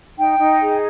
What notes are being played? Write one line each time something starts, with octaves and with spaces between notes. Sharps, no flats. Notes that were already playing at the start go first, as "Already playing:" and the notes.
D#4 G5
D#4
G#4